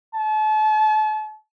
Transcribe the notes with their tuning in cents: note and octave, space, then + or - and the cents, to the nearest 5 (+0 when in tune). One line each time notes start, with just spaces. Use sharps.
A5 -35